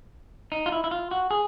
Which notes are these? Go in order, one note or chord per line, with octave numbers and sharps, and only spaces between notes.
D#4
F4
E4
E4
F4
F#4
G#4